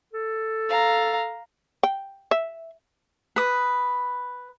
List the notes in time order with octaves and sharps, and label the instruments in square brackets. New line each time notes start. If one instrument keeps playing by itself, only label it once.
[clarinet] A4
[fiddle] F5 A#5
[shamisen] G5
E5
[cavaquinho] B4 D#6